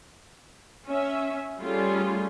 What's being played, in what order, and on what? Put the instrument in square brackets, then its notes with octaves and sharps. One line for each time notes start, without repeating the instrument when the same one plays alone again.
[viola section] C#4 E5
G3 A3 C#4 F4 G#4